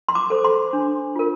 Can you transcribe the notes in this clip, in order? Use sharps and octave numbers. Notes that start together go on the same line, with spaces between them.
C6
D6
A4 C5
C6
D4
F4 A#4